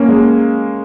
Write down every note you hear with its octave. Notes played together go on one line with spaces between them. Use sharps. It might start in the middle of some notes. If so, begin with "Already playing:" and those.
Already playing: A#3 C#4
G#3